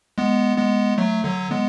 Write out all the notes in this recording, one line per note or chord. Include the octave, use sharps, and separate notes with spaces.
G#3 B3
G#3 B3
F#3 A3
D3 F#3
G#3 B3